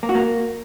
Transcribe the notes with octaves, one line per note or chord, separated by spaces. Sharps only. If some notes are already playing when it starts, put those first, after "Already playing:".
A#3
F#4
A#3